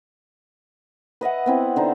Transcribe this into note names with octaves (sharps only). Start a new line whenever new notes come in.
B4 D#5 E5 F#5
B3 C4 E4
D3 D#4 C5